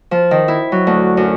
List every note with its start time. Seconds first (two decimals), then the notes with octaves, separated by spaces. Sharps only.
0.11 F3
0.31 D#3
0.48 E4
0.72 F#3
0.87 D2
1.17 F#2